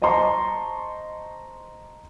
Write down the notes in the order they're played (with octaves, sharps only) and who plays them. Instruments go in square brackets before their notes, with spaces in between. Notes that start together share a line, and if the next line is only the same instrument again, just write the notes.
[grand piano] C5 D#5 A5 A#5 C6 C#6